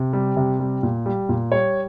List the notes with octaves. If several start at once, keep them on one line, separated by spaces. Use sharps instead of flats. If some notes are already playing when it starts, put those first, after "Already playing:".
Already playing: C3
G3
C3
G3
A#2
G3
A#2
G3 C#5